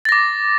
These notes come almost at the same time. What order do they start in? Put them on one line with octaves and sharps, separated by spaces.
A6 A#6 D6